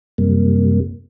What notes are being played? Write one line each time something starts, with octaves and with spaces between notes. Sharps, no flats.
F#2 C3 G3 A#3